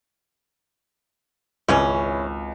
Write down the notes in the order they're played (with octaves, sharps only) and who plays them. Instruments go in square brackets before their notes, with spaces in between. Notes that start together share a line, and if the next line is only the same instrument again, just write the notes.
[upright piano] G#1 C#2 [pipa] B2 E3 C#4